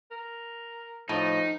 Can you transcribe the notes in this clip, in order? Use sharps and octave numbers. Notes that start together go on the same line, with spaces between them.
A#4
A2 D#3 F3 D#4